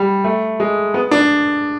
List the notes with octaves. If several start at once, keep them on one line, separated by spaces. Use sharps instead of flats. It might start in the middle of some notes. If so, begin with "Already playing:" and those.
Already playing: G3
A3
G#3
B3
D4